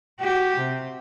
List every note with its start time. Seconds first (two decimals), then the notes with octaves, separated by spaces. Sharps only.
0.21 F#4 G4
0.58 C3